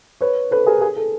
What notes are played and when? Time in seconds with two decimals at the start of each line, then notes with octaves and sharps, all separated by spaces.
0.21 B4 C#5
0.51 A4 B4
0.66 G#4 A#4
0.81 G#4
0.96 A4